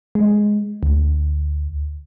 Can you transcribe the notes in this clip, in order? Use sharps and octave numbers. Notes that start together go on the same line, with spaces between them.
G#3
D2